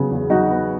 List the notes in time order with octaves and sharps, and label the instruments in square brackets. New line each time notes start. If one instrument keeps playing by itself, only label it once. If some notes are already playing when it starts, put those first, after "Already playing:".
Already playing: [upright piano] C#3 F#3 B3
E2
F#3 D#4 F#4
B3